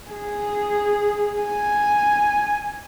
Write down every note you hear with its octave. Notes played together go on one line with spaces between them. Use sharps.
G#4
G#5